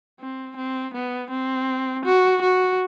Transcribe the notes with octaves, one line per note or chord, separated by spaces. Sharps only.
C4
C4
B3
C4
F#4
F#4